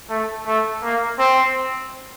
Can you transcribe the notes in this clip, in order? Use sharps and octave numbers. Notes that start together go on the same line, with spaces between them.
A3
A3
A#3
C4